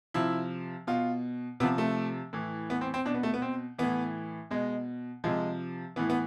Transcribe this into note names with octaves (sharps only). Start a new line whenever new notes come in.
C3 F3 E4
B2 F4
C3 F3 B3
A3
A2 E3
B3
C4
C4
B2 D4
B3
A3
B3
C4
A2 E3 B3
B2 G#3
C3 F3 G#3
A2 E3 B3
B3